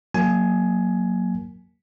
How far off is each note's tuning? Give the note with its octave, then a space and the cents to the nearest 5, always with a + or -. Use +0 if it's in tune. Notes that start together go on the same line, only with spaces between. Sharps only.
F#3 -10 A#3 -5 G#5 +15